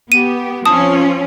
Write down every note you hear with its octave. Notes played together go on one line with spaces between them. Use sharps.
B3 G4 D#7
F3 C4 C#4 A5 D#6